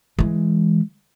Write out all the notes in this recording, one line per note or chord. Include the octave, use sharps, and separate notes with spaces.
E3 G#3